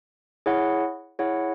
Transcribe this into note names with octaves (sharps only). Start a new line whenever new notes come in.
E4 G#4 C#5 F#5
E4 G#4 C#5 F#5